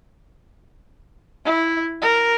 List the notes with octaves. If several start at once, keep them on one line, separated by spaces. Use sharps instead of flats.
E4
A#4